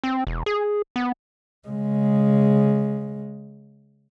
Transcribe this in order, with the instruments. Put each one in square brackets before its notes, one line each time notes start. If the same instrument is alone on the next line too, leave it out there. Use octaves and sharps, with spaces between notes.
[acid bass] C4
E1
G#4
B3
[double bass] C#3 G#3